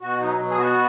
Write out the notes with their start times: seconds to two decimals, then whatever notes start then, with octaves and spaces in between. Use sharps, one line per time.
0.01 B2 F#4
0.20 F#3 D#4
0.39 B2
0.50 G#4
0.58 B3 F#4